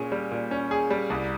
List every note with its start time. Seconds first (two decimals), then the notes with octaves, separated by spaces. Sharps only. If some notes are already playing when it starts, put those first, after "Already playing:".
Already playing: A#2 C#4 G#4
0.12 G3
0.32 A#2
0.51 C#4
0.71 G#4
0.90 G3
1.10 C2